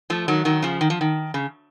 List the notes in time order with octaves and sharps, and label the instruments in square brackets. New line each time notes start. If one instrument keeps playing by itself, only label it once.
[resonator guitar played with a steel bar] F3 A3
D#3 F#3
D#3 F#3
C#3 F3
D#3
F3
D#3
C#3